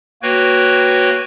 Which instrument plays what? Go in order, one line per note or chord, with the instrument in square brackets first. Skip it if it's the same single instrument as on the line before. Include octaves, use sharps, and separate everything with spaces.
[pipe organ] A#3 F#4 B4 C#5 G5